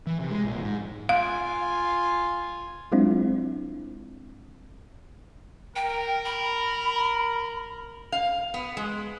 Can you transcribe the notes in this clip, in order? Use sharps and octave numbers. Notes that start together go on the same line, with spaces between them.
E3
C3
G#3
A#1
G#2
F4 F5 G#5
F#3 G#3 C4 D4 E4 F4
A#4 G5
B5
F5
B3
G#3